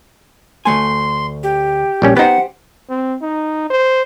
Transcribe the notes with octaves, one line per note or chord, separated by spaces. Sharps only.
D2 A3 G#5 C6
G4
A#1 G3 C#4
B3 D#4 G4 C5 F#5
C4
D#4
C5